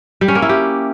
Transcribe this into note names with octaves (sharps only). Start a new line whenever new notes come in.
G3
C#4
A#3
E4
G4